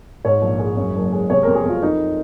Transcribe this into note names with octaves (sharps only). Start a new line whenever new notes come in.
G#2 C#5
A#1
G#3
F#2
F#1
G#3
C3 C#5
F2 A#4
G#4
F2
F4
F2 D#4